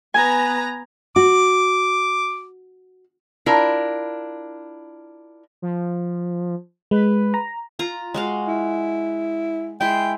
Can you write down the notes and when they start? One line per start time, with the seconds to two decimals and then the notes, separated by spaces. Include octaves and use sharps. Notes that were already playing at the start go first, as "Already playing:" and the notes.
0.14 B3 B4 G#5 A#5
1.16 F#4 D6
3.46 D4 E4 F4 A#4
5.62 F3
6.91 G#3 B4
7.34 A#5
7.79 F4 A#5
8.14 G#3 F#4 F5
8.48 E4
9.81 G#3 E4 G#4 G5